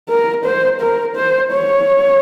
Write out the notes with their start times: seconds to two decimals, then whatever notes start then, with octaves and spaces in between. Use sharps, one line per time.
0.09 A#4
0.45 C5
0.81 A#4
1.16 C5
1.52 C#5